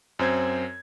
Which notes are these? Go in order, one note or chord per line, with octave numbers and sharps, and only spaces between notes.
F#2 C4 C5 G#6